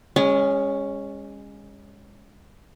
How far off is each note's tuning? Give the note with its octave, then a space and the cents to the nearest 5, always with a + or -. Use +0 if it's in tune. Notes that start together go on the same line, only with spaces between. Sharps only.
G#3 -30 C#4 +0